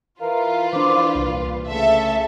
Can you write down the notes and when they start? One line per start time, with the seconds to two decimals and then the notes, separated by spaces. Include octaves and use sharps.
0.21 E3 F4 A#4 B4 F5
0.73 E3 D4 C5 D6
1.15 C2 A#2
1.69 C#3 A3 A4 E5